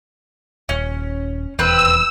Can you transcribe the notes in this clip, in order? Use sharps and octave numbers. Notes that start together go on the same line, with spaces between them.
D#1 C#4
D#1 E2 C4 B4 E6